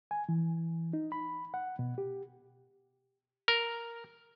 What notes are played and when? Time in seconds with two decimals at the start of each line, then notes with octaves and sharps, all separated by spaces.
0.11 G#5
0.29 E3
0.93 D#4
1.12 B5
1.54 F#5
1.79 B2
1.98 G4
3.48 A#4